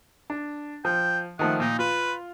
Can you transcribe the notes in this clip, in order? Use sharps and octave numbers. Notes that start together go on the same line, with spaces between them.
D4
F3 G5
D#3 F3 A3 F#5
A#2 D#4
F4 B4